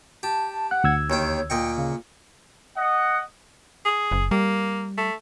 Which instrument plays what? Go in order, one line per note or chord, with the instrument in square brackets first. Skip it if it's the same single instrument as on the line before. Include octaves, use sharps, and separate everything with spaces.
[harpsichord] G4 [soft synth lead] A5
[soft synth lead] F#5 [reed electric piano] F#6
[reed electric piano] D2 E6 G#6
[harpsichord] D#2 D#3 G5 [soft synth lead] C#5
[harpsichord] A#2 D#5 C#6 [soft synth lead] G5
[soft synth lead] C#3
[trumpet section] D#5 F#5
[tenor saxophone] G#4
[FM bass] F#1
[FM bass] G3 [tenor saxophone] A#3
[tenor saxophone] A3